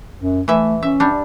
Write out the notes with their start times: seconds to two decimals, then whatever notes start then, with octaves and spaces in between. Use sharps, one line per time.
0.19 F#2
0.48 E3 A3 E5
0.83 C#4 E5
1.00 G3 D4